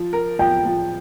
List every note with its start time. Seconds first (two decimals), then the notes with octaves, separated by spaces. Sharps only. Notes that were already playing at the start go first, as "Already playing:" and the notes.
Already playing: F3
0.13 A#4
0.39 F3 G5
0.65 F3